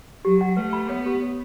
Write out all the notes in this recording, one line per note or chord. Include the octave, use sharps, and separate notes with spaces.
F#3 G4
F#5
A3 B4
B5
B3 C#5
G4
C#5